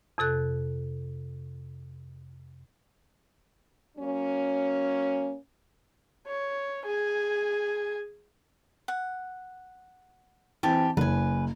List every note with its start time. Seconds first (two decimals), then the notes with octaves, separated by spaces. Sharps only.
0.18 F2 C3 A4 F#6
3.98 F#3 A#3 C#4
6.27 C#5
6.85 G#4 G#5
8.88 F#5
10.63 E3 C4 G4 G#5 A5
10.97 F#1 B4 G#5